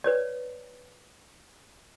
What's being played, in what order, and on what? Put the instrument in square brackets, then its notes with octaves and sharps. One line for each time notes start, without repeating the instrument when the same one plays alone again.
[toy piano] B4 C#5 D5